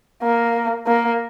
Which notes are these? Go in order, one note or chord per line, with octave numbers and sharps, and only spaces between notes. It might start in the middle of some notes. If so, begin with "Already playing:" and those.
A#3
A#3